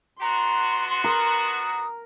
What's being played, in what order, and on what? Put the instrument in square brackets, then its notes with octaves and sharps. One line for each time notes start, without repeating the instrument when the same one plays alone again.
[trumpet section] B3 D4 F#4 [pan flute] A#5 [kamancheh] C6
[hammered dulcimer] A#4 [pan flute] D#6